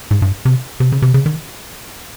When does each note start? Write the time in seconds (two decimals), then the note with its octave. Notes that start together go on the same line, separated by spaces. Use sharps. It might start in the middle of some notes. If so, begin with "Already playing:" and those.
0.11 G#2
0.22 G2
0.45 C3
0.80 C3
0.92 C#3
1.02 C3
1.14 C#3
1.26 D#3